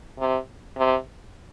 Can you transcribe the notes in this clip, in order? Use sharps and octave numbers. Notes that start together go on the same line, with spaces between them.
C3
C3